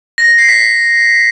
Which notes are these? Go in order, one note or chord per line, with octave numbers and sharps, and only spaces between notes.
A#6
A#6
C7
B6